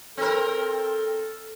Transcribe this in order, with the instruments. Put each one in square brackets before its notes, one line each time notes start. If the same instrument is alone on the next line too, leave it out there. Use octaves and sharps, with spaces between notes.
[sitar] C4 A#4 [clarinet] A4